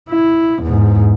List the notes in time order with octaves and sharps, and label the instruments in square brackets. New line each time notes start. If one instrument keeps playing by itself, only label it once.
[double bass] E4
E2 G#2